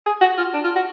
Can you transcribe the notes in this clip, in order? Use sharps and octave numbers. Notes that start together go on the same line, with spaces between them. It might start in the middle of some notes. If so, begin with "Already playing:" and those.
G#4
F#4
F4
D4
F4
F#4